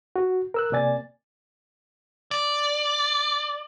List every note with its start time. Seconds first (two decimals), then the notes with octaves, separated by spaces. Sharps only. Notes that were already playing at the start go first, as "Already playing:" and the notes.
0.16 F#4
0.54 A#4 E6 F#6
0.72 C3 A#3 D5 G#5 A6
2.31 D5